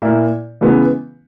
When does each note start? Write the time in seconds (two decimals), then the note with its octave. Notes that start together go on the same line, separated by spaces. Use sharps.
0.02 A#2 A#3 E4
0.61 C#3 E3 G#3 B3